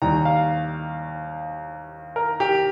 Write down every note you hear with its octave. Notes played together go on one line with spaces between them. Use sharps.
D#2 D#3 G3 A#5
F5
A#4
G4